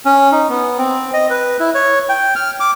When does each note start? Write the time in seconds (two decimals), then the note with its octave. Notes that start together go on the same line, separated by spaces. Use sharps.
0.05 C#4
0.32 D#4
0.49 B3
0.78 C4
1.13 D#5
1.30 B4
1.60 E4
1.75 C#5
2.09 G5
2.35 F6
2.60 D6